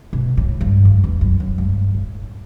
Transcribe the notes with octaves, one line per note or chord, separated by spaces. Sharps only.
B2
A2
G2
F#2
E2
F#2
F#2
G2
A2